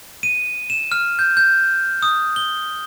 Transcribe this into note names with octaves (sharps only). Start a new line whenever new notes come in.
D#7
E7
F6
G6
G6
D#6
G7